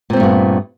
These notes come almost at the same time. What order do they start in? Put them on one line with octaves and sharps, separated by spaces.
A#2 C4 A3 G2 B3